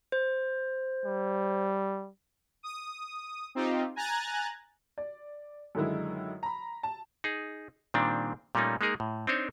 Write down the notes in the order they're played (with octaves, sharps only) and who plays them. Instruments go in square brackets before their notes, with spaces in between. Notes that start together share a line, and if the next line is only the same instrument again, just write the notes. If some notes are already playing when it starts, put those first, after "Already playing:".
[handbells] C5
[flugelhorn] G3
[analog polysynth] D#6
C4 D#4 F4 G4
G#5 A#5 F#6 G#6 A6
[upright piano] D5
F#2 D3 D#3 G#3 E4
A#5 B5
A5
[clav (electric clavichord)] D#4 G#4
A#2 D#3 G3 C4 D4
A#2 G3 A3 A#3 C#4 D#4
G#3 A#3 D#4 G#4 A#4
A2
C4 D4 D#4 C5 C#5